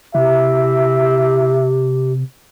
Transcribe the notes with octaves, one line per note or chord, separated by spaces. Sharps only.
C3 E4 G4 E5